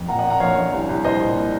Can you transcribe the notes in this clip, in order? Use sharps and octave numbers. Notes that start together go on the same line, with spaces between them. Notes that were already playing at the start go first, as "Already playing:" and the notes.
Already playing: F2
A#2 F#5 A#5
D#5 F#5
A#2
F#5 A#5
A#1 C#5 F5
A#1
C2
C2
C2 C5 D#5
A#2